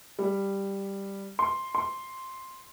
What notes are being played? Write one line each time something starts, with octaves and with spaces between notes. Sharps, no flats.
G3
C6
C6